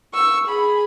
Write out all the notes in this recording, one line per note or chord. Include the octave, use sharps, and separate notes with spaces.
C#6 E6
G#4 B5